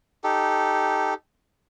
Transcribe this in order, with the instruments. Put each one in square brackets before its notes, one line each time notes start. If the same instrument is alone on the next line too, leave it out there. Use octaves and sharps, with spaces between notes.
[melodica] D#4 G4 A4